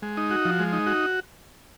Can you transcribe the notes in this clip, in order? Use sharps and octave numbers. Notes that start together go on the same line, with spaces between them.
G#3
D#4
F#4
F3
G#3
D#4
F#4